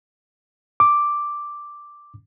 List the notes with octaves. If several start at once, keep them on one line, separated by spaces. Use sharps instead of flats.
D6